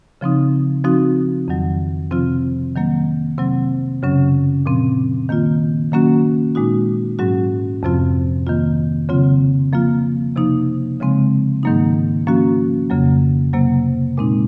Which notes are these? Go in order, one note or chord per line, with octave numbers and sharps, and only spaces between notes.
C#3 F3 C4 D#4
F3 C4 D#4 F#4
F2 D#3 F#3
C3 F3 C4 F4
D#3 F#3 A#3
C3 F#3 C4
F#2 C#3 F#3 C#4
A#2 F3 C4
D#3 A#3 F4
D#3 F#3 A#3 C#4 F#4
A#2 G#3 D#4 F#4
G#2 F#3 C#4 F#4
F2 C3 F3 C4 F4
D#3 A#3 F4
C#3 F#3 C4 F4
F3 A#3 F4
C3 F3 A#3 D#4
C#3 F3 G#3 C4
G#2 D#3 F#3 A#3 D#4
F3 A#3 C#4 F#4
F2 C#3 F#3 A#3
C3 F#3 A#3
A#2 G#3 C4 D#4